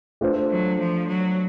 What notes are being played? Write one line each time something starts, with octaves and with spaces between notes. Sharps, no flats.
A3 D4 F4 A4 C5
F#3
F3
F#3